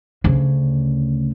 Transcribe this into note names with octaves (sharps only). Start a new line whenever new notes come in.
D2 C#3